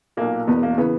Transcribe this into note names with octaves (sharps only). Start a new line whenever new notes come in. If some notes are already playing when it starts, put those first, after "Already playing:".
B1 A#2 A#3
E1 E2 B2 B3
A#3
C#3 E3 B3